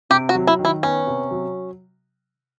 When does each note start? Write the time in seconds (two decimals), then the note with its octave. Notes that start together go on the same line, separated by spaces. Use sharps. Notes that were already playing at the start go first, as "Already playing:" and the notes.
0.10 C3 G4
0.29 F#4
0.35 F#3
0.47 E4
0.59 D#3
0.65 E4
0.83 B3 C#4
1.07 C3
1.31 F#3